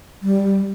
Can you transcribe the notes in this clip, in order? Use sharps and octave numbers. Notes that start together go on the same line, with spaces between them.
G3